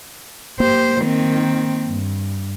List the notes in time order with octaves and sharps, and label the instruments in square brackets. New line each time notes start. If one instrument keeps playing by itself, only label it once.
[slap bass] A#3 [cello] G4 C5
[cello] D#3 C4
G2